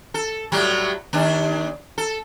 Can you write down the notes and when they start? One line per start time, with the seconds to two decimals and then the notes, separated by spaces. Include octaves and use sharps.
0.14 A4
0.52 A2 F#3 G3
1.13 D#2 D4
1.98 A4